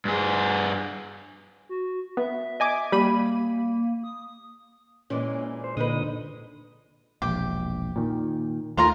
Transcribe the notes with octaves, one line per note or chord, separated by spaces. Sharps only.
G2 G#4
F#4
B3 E5
D#5 G#5 D6
G3 A#3 B5 D#7
D#6
A#2 E3 G#3 C#4
C5
A#2 D3 G#3 D#4 B4 D#6
E1 A#1 G4
A#2 D#3
D#2 D#3 A3 F4 A#4